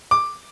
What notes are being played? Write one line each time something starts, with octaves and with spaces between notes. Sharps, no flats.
D6